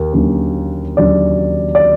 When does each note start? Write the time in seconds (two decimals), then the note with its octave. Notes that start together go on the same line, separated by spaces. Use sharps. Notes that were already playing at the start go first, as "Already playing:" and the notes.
Already playing: D#2 A#3
0.13 D#2 D3 F#3 A#3 C#4
0.97 D#2 D3 F#3 A#3 C#4 D5
1.75 D5